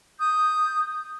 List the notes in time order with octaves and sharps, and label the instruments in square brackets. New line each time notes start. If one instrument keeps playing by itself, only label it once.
[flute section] D#6 G6